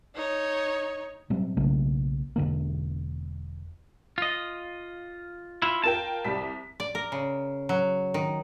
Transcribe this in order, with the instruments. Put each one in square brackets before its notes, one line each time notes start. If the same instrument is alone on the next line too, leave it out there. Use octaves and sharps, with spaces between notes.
[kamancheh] D#4 C#5
[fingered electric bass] A#2 F#3 G3 C4
B1 C#3 A3 A#3
E1 D3 A#3
[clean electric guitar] F4 D#5
E4 F4
[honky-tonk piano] F4 A#4 G5 [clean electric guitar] A5
[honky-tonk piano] C2 G3 B6
[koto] D5
A#4
C#3
F#3
D#3